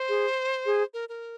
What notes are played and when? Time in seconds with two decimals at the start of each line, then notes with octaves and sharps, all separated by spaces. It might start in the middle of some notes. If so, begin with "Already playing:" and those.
Already playing: C5
0.09 G#4
0.66 G#4
0.94 A#4
1.09 A#4